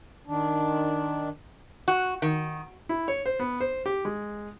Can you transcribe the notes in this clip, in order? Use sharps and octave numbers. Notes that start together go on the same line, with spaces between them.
D#3 D4
F#4
D#3
E4
C#5
C5
B3
C5
G4
G#3